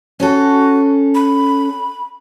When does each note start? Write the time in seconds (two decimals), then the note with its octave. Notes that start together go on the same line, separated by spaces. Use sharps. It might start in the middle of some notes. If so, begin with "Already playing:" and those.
0.20 C#4 F#4 A4
1.15 B5